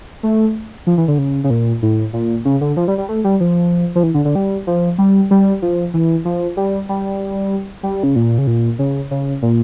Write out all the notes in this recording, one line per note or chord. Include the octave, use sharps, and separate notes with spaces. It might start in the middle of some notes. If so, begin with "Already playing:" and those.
A3
F3
E3
D3
C#3
C#3
A#2
A2
A#2
C#3
D3
F3
G3
G3
A3
G3
F3
F3
E3
D3
D3
G3
F3
G3
G3
F3
E3
F3
G3
G3
G3
C#3
A#2
C#3
A#2
C#3
C#3
A#2